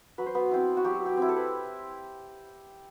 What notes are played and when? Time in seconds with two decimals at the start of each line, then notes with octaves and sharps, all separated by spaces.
0.18 F#3 B4
0.26 C5
0.35 B3 B4
0.51 C4 E4
0.77 F#4
0.84 F#3 G4
1.06 G4
1.17 C4 E4
1.29 A4
1.36 B4